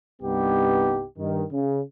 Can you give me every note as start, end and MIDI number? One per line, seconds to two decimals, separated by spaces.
0.22 1.04 36
0.22 1.04 43
0.22 1.04 59
0.22 1.04 63
0.22 1.04 67
1.18 1.43 43
1.18 1.43 51
1.51 1.82 49